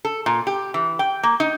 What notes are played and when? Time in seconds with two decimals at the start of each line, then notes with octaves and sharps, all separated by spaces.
0.05 A4
0.26 A#2
0.47 G4
0.74 E3
0.99 G5
1.23 A#3
1.40 D#4